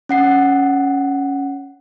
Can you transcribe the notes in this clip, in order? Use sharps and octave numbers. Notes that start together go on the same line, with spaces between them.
C#4 F#5 C7